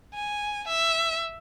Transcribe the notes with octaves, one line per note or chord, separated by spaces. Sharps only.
G#5
E5